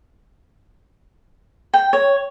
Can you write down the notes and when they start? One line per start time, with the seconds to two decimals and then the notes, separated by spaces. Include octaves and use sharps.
1.74 G5
1.93 C#5